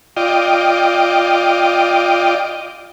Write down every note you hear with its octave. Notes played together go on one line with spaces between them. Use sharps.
F4 D5 D#5 G5